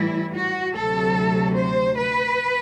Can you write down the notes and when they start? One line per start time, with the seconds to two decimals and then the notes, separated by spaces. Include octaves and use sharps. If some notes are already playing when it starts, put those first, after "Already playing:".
Already playing: A2 E3 G3 E4
0.33 F#4
0.74 D2 C3 F#3 A4
1.56 C5
1.98 B4